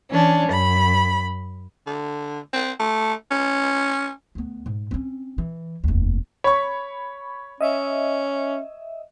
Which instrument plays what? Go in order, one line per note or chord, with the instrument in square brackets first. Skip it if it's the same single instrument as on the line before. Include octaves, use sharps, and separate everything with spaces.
[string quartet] E3 C#4 D4
F#2 B5
[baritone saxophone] D3
C4
A3
C#4
[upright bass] D2 B3
G#2
C4 C#4
E3
F1 D#2
[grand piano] C#5 C#6 [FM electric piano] B5
[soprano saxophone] C#4 [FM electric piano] D#5 E5